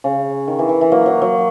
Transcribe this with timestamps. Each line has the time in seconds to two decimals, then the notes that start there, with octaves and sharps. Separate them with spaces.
0.04 C#3
0.48 D#3
0.59 E3
0.69 E3
0.81 E3
0.92 F#3 A#3
1.06 F#3
1.22 F#3